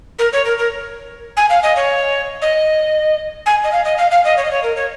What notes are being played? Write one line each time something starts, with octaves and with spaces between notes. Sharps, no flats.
A#4
C#5
A#4
A#4
G#5
F5
D#5
C#5
D#5
G#5
D#5
F5
D#5
F5
F5
D#5
C#5
D#5
C#5
A#4
C#5